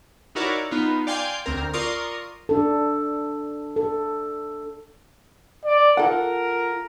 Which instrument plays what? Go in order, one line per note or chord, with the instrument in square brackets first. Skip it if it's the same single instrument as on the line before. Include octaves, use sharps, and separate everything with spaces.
[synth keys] D#4 E4 F#4 A#4 C#5 D5
B3 D#4 F4
D5 F5 G5 G#5 C6
D2 C4 A#4
F4 A#4 D5 C6 C#6 D#6
[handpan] D4 A4
A4
[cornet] D5
[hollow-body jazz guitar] F4 A4 F#5 [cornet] A#4